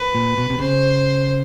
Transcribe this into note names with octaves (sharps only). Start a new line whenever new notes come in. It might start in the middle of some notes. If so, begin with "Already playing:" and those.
Already playing: B4
A#2
B2
C3
C#3 C5